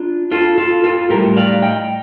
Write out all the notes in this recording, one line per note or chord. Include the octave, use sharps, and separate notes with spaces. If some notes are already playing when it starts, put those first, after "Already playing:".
Already playing: D4 F4
F4 A4
F4 A4
F4 A4
A2 G3 G4 A#4
D5 F5
D#5 G5